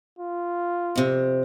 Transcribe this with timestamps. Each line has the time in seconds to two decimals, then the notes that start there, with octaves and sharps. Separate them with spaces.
0.19 F4
0.96 F2 C3